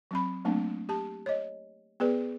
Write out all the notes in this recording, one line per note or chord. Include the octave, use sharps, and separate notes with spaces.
F#3 C4 B5
F#3 A3 A#3 C4 D4
G4 A5
C#5 D#5
B3 G#4 B4 D5